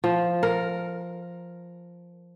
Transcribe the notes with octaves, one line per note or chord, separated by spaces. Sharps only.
F3
A#4